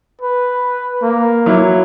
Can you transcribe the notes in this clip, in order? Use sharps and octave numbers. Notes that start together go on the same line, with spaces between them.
B4
A#3
F#3 E4